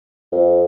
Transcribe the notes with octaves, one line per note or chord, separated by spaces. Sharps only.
F2